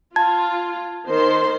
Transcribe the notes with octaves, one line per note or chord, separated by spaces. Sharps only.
F4 A5 G#6
D#3 C5 C6